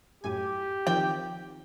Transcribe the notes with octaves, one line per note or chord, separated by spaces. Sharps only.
F#2 A2 G4 G#5
D#3 F3 C4 G5